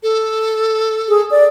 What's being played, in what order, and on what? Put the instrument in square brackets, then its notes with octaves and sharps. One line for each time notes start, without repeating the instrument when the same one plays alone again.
[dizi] A4
[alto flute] G#4
D5